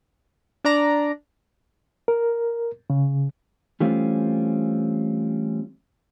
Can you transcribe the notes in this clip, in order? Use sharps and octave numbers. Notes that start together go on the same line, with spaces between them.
D4 D5 A#5
A#4
C#3
E3 G3 A3 C4 C#4 F4